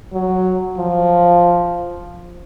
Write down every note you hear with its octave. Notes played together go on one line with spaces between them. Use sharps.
F#3
F3